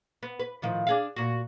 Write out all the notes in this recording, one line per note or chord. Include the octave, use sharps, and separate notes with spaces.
B3
B4
A2 D#3 F3
D4 G#4 F5
A#2 F#4